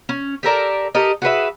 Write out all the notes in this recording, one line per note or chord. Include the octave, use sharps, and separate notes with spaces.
C#4
G4 A4 A#4 D5
G4 A4 A#4 D#5
F#4 G#4 B4 E5